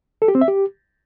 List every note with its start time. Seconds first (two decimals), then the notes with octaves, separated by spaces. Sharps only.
0.22 A4
0.28 G4
0.35 C4
0.41 E5
0.48 G4